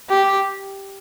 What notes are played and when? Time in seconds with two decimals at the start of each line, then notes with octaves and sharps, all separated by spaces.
0.10 G4